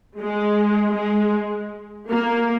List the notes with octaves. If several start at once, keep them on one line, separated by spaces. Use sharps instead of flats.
G#3
G#3
A#3